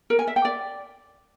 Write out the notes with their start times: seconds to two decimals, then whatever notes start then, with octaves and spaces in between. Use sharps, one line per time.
0.10 A#4
0.19 G#5
0.27 E5
0.36 G5
0.45 D5